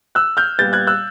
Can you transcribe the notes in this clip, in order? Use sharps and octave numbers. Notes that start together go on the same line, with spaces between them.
E6 F#6
F6 G6
A#2 G3 B3 G6 A6
F#6 G#6
E6 F#6